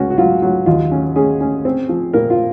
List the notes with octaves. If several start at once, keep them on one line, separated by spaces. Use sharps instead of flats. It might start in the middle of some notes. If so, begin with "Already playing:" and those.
Already playing: C#2 C#4 F#4
F#4
F#3 F4
F#3 F4
D#2 F4
C#4
C#4 G#4
C#4
C4
F3
A#2 A#4
F4